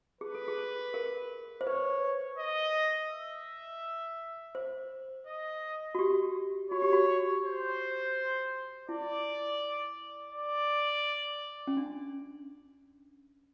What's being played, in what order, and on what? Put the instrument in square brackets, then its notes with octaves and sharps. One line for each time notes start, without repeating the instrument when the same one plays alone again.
[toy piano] G#4 [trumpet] B4
[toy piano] A4
G#4
A#4
C5
[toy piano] B4 [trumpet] C#5
[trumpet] D#5
E5
[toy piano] C5
[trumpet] D#5
[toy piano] F#4
G4
[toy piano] F#4 [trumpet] C#5
[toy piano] G4
F#4
[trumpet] C5
[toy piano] E4 [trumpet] D5
[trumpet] D5
[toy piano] C#4
D4